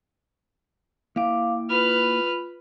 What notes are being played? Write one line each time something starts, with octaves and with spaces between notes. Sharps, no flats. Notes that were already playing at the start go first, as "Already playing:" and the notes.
A#3 E4 F5 G5 D6
F4 B4 B5 F6